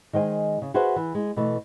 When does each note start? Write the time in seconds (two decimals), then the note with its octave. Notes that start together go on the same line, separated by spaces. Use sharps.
0.13 D#3 G#3 C5 G5 G#5
0.62 C#3
0.74 F#4 G#4 B4 C5 E5 F#5
0.96 E3
1.15 G#3
1.36 B2 E3 A3